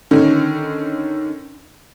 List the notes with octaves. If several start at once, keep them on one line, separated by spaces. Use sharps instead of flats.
D3 D#3 C#4